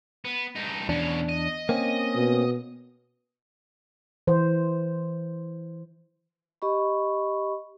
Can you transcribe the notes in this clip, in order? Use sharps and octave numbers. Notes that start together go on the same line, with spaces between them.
B3
G2 D#4
E2 B2 C#4 D4
D#5
A#3 C4 C#4
B2
E3 C5
G4 D#5 B5 C#6